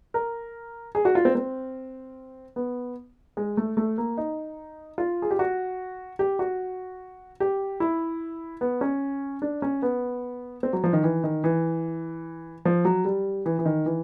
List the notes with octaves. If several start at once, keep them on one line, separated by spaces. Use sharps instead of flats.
A#4
G#4
F#4
F4
C4
C4
B3
G#3
A3
A3
A#3
D#4
F4
G#4
G4
F#4
G4
F#4
G4
E4
B3
C#4
D4
C#4
B3
C4
F#3
F3
D#3
E3
D#3
E3
F3
F#3
G3
E3
E3
D#3
E3